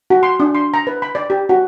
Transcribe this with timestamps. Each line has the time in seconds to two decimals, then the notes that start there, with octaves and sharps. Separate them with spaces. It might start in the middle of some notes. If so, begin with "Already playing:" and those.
0.10 F#4
0.23 C6
0.40 D4
0.55 C6
0.74 A#5
0.87 B4
1.02 B5
1.15 D5
1.30 G4
1.49 F#4